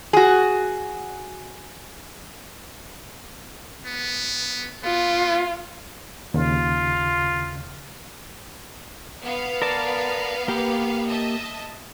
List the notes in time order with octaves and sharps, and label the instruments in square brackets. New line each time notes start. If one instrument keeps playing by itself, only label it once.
[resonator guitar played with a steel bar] F#4 G#4
[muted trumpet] B3
[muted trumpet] B3 [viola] F4
[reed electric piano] D#2 C#3 [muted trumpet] F4
[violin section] B3 F5
[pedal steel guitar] A#4 D5 A5
A#3 G4
[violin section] D#5 E5 A5